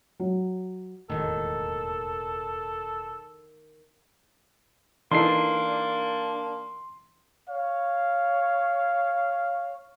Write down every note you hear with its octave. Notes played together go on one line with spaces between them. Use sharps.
F#3
E1 D#2 A2 D#3 A4
E3 A#3 D4 D#4 A4 C6 C7
C#5 F5